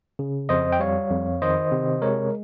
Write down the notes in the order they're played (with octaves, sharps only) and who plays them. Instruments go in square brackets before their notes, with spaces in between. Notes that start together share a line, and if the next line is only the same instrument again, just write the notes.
[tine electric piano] C#3
F2 C5 D#5
G5
G3 C#5 F5
F2
D#3 C5 D#5
C3
G#3 A#4 C#5